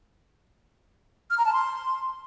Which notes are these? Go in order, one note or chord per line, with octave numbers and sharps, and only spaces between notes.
F6
A#5
A5
C6